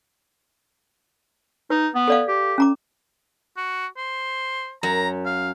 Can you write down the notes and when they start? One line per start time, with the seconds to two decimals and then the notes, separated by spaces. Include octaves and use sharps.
1.70 D#4 B4
1.95 B3
2.08 A4 D5 F5
2.28 G4
2.58 C#4 A#5 D6
3.57 F#4
3.97 C5
4.83 F#2 A#5
5.26 F5